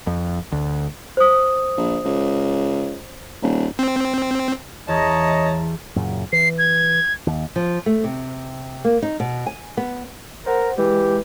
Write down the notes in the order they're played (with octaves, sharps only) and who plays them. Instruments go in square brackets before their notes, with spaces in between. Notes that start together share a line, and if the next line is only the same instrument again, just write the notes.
[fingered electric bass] F2
D2
[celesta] C5 D#6
[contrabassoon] A#1
C#2
D#1
[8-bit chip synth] C4
[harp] E2 [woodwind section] C#5 D#5 [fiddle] A5 A#5
[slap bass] F#2 A#2 C#3
[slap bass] E3 [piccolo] C7
[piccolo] G#6
[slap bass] D#2
[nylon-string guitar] F3
A3
C3
A#3
D#4
B2
G#5
B3
[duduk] A#4 [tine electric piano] C5 F#5
[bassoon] E3 [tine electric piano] G#3 [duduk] G4